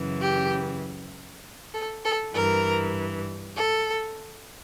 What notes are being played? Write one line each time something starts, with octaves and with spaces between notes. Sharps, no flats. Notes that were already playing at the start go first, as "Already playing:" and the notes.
Already playing: F#2 C#3 E3
G4
A4
A4
G2 E3 A#4
A4